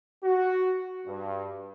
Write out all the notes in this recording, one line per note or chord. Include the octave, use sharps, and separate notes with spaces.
F#4
G2